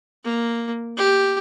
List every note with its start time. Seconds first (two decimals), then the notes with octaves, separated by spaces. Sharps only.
0.24 A#3
0.97 G4